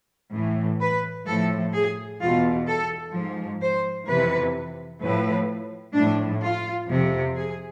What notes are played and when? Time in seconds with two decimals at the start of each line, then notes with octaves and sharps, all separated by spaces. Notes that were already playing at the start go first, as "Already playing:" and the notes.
0.33 A2 E3
0.81 B4
1.27 A2 F3 A4
1.74 G#4
2.21 E2 B2 F4
2.68 A4
3.14 G#2 F3
3.62 C5
4.08 F2 C3 E3 B4
5.01 A2 F3 B4
5.95 A2 F3 D4
6.43 F4
6.89 F2 C3 F3
7.36 G#4